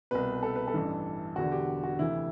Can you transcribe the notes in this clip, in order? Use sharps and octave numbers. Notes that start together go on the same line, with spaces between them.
C2 B2 B4
A4
B4
A4
A1 G2 E3
E1 E2 D3 F#4
G4
F#4
D2 C3 E3 E4